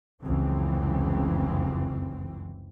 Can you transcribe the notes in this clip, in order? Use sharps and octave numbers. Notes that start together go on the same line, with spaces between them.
F1 C#2 F#2 E3 C4